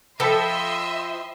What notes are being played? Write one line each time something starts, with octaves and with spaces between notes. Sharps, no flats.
F3 A4 D#5 E5 G5 B5 C6 B6